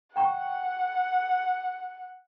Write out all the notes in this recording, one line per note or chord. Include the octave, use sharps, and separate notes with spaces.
F#5 G5 A#5 C#6